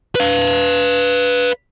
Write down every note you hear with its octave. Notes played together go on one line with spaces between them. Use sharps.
B4 F5